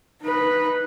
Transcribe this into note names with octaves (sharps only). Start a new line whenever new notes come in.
D#4 B4